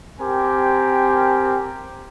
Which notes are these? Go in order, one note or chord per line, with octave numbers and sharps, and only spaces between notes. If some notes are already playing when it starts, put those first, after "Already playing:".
C4 G4 A#4 G#5